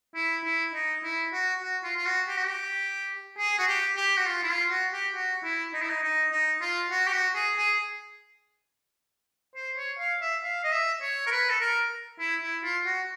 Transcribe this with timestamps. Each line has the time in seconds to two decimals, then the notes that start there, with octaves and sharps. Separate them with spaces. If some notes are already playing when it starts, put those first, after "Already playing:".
0.15 E4
0.44 E4
0.74 D#4
1.04 E4
1.33 F#4
1.62 F#4
1.84 F4
1.96 F4
2.06 F#4
2.28 G4
2.37 F#4
2.46 G4
3.39 G#4
3.59 F#4
3.68 G4
3.97 G4
4.17 F#4
4.26 F4
4.43 E4
4.49 F4
4.71 F#4
4.93 G4
5.14 F#4
5.44 E4
5.74 D#4
5.82 E4
5.90 D#4
6.03 D#4
6.32 D#4
6.61 F4
6.91 F#4
7.07 G4
7.13 F#4
7.35 G#4
7.57 G#4
9.55 C5
9.77 C#5
9.99 F5
10.22 E5
10.44 F5
10.64 D#5
10.72 E5
11.02 C#5
11.27 A#4
11.31 B4
11.50 A4
11.61 A#4
12.20 E4
12.42 E4
12.64 F4
12.86 F#4